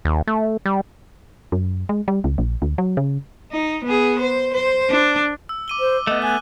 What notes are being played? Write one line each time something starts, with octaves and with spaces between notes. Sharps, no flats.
D#2
A3
G3
F#2
G#3
G3
C#2
A#1
D2
F#3
C#3
D#4
B3 G#4
C5
C5
D4
E6
D6 D#7 G7
C5
A3 B3 D#5
G#5 F#6